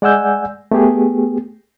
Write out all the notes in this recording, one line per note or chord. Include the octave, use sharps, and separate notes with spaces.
G#3 D5 F#5 G#5 E6 G6
A3 B3 G4 G#4